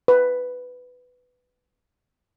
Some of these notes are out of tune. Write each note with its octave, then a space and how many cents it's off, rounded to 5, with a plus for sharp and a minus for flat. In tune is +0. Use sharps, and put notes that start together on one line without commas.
B4 +10